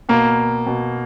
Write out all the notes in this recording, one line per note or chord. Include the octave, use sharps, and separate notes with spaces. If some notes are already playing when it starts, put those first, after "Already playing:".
B2 A#3
B2